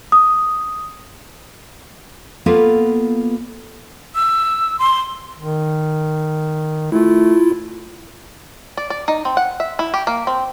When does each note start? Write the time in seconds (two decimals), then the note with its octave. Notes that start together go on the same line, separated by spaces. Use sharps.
0.12 D#6
2.46 A#3 B3 F4 A4 B4
4.15 E6
4.79 C6
5.38 D#3
6.92 A3 E4 F4
8.77 D5
8.90 D5
9.08 D#4
9.25 C4
9.37 F#5
9.60 E5
9.79 E4
9.94 G4
10.07 A#3
10.27 C4